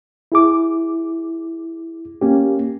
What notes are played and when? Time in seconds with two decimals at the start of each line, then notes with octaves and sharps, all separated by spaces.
0.32 E4 G#4 D6
2.21 A#3 C#4 G4